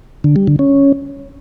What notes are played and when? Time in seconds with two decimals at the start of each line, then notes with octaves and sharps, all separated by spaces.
0.24 D3
0.36 G3
0.47 D3
0.59 C#4